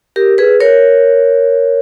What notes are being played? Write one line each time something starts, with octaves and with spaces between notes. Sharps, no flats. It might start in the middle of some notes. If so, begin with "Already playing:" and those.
G4 A#4
G#4 B4
A#4 C#5